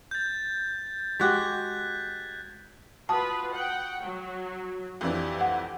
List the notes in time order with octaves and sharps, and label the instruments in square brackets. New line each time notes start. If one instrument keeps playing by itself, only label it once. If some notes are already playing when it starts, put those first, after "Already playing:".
[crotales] G6 A6
[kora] G#3 F#4 G4 [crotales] F#6 G#6 B6
[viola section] F4 B4 [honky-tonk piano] F#4 D#6 [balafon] A5
[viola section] F#5 G5
F#3
[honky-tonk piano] F2 E3 D4 [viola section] G4
[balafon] F#5